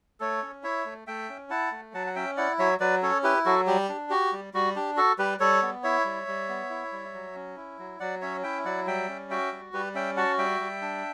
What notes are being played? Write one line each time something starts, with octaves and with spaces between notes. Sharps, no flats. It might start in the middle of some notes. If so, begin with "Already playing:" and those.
A3 A4 C#5
C#4
E4 C#5 E5
A3
A3 E5 G5
C#4
E4 F#5 A5
A3
F#3 F#5 A5
F#5
C#4 E5 G5
E4 D5 F#5
F#3 C#5 E5
F#3 B4 D5
C#4 A4 C#5
E4 G4 B4
F#3 F#4 A4
G3 G4
D4
F#4 G4
G3
G3 F#4
D4 G4
F#4 A4
G3 G4 B4
G3 A4 C#5
B3
E4 C#5 E5
G3
G3
B3
E4
G3
F#3
C#4
E4
F#3
F#3 D5 F#5
C#4 C#5 E5
E4 E5 G5
F#3 D5 F#5
G3 E5 G5
C#4
F#4 E5 G5
G3
G3 G4 B4
C#4 E5 G5
F#4 F#5 A5
G3 E5 G5
G3
D4